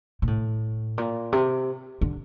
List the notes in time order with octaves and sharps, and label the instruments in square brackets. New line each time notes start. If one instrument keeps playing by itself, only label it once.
[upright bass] A#2
A2
A#2
C3
D3